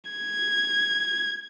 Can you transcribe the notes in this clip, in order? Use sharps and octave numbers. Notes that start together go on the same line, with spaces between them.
G#6